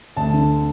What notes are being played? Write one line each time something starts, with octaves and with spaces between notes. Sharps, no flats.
D2 A5
D3